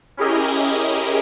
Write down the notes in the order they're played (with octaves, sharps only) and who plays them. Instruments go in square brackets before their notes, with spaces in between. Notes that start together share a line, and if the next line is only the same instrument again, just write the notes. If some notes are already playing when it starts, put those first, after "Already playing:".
[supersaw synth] C#4 E4 G4 G#4 A#4 D#5